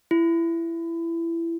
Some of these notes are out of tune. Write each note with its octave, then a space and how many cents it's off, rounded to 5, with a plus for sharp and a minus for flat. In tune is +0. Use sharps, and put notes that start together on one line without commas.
E4 +20